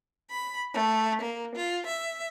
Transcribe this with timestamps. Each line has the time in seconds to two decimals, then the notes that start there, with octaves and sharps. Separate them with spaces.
0.30 B5
0.74 A3
1.22 A#3
1.55 F4
1.86 E5